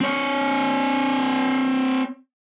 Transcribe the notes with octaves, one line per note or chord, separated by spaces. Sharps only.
C4 C#5